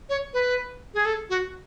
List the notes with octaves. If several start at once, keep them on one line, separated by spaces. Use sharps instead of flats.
C#5
B4
G#4
A4
F#4